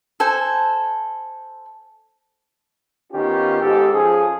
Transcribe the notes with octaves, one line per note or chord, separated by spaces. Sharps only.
A4 C5 G#5
D#3 B3 C#4 F4 G4
G#2 G4 A4
F3 C#4 G#4